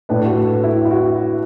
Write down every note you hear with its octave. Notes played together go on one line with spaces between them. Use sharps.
A2 A3 D4 B4
F#4
A4
E4
E4
F#4